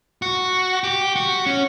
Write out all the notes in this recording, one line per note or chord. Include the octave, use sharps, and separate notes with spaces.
F#4
G4
F#4
C#4